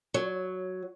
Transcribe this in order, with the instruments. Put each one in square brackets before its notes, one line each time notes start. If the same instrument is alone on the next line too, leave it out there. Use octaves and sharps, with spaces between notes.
[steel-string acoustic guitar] F#3